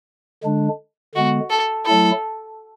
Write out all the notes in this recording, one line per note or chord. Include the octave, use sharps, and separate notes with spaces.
D3 G#3 D4
D3 G#3 B3 F#4
A4
F#3 A3 E4 A4